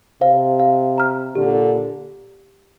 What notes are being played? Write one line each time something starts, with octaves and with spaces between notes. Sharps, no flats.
C3 C5 F5
F5
A#5 F6
A#2 D3 G4